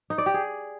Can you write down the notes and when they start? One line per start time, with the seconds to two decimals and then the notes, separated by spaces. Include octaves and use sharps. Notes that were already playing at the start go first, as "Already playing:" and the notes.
0.10 D#4
0.18 D5
0.26 G4
0.34 G#4